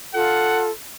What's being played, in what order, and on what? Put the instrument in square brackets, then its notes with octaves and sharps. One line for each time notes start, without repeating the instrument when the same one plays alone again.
[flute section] F4 A4 [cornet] F#5